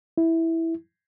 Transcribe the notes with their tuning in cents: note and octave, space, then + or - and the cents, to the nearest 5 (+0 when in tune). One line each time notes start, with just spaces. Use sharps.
E4 -5